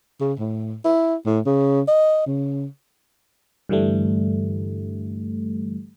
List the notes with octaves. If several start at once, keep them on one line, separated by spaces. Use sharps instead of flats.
C#3
A2
E4
A2
C#3
D#5
C#3
G2 D3 E3 G3 A3